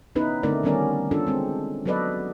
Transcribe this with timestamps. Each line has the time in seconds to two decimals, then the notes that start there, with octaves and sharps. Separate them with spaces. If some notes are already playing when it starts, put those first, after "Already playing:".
0.15 B3 C#4 D#4 E4 B4
0.43 D3 A3 C4 D#4 A#4 D5
0.63 D#3 G3 B3 C#4 A#4 D5
1.11 C#4 D4 F4 A4
1.27 G#3 C4
1.86 F#3 B3 A4 B4 D5 D#5